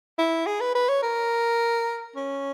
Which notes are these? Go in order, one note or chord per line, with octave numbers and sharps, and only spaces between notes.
E4
G#4
B4
B4
C#5
A#4
C#4